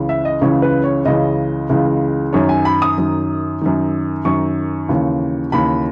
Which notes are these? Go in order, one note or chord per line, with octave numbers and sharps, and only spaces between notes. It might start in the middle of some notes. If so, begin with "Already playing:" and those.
Already playing: C#2 C#3 E3
E5
D#5
C#2 C#3 E3 C#5
B4
C#5
C#2 C#3 E3 D#5
C#2 C#3 E3
F#2 D#3 C#5
G#5
B5
D#6
F#2 D#3
F#2 D#3
F#2 D#3 C#6
D#2 C#3 E3
D#2 C#3 E3 B5